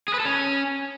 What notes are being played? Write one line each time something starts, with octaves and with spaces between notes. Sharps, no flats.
G#4
B4
A4
C#4